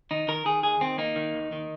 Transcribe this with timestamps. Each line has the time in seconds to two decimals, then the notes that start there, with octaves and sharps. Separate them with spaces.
0.11 D#3 D#4
0.28 D#3 A#4
0.45 D#3 G#4
0.63 D#2 G#4
0.81 D#3 C4
0.98 A#3 D#4
1.16 D#3
1.34 D#2
1.52 D#3